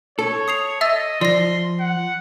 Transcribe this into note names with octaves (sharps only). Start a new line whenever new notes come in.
A4 C#5
D#6 C7 F7
D#5 E5 E6 A6
F3 D5 C6 A#6
F#5